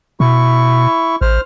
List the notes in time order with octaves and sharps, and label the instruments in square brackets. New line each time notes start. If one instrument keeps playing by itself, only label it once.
[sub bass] B2 [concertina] E4 C#6
[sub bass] A1 [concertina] C5 F6